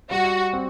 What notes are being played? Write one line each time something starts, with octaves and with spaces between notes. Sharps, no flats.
G3 F#4
C4